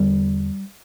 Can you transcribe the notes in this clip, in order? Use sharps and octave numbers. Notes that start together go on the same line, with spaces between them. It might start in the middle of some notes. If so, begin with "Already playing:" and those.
Already playing: E2 D3 G3